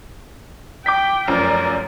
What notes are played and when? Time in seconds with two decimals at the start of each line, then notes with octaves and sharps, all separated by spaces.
0.86 G5 D6 G6 B6
1.27 F1 F#2 F3 A#4 D5